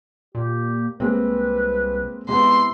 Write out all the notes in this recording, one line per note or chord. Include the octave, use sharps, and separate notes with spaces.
A#2 G4
C2 G#3 A#3 C4 B4
C3 G#3 B3 E4 C6